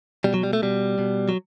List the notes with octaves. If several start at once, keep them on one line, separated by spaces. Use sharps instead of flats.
B2 G3
F#3
G3
A3
B2 G3
B2
F#3